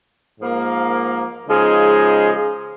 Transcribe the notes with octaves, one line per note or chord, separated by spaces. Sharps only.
G#2 F3 A#3
C#3 F3 G#3 D#4 G#4